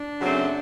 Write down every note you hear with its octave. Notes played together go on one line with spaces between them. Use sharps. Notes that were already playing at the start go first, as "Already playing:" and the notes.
Already playing: D4
F#2 C#3 F#3 A3 C4